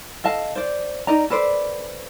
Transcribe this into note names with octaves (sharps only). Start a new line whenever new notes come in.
A4 D#5 F5 A5
C5 D5
D#4 D5 A#5
A4 B4 C5 D5